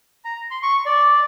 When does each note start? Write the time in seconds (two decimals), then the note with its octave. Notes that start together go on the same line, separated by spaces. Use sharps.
0.25 A#5
0.51 C6
0.63 C#6
0.86 D5